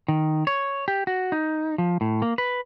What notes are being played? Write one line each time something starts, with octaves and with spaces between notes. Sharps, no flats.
D#3
C#5
G4
F#4
D#4
F3
A2
A#3
B4